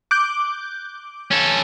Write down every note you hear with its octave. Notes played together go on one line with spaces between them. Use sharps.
D6 F#6 G6
C#4 A4